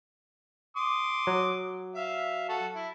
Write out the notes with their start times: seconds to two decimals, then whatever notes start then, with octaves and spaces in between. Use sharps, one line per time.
0.77 C6 D6 D#6
1.27 F#3
1.95 E5 F5
2.49 F#4 A4
2.75 E4